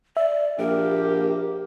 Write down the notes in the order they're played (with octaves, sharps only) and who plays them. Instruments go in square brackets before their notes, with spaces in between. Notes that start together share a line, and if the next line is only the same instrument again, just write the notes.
[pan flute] D5 [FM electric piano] E5
[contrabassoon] A#1 [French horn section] A#3 G4 [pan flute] A#4